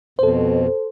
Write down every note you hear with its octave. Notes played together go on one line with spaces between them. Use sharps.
F2 B2 A4 C5